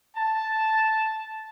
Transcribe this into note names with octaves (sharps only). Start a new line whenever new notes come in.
A5